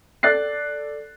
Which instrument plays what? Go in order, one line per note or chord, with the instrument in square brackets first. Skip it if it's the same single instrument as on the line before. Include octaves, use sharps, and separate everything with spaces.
[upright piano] A4 D5 F#6 A6 C7